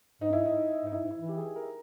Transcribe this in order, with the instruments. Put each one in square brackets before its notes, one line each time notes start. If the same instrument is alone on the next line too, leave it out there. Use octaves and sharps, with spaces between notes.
[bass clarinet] G#2 [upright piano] D#4
[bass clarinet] G2 [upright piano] E4
[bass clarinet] G#2
[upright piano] D#4
[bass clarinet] G#2 [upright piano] D#4
[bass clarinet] G2 [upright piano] E4
[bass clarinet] G#2
[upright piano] E4
[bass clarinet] E3
[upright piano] G4
G#4
A#4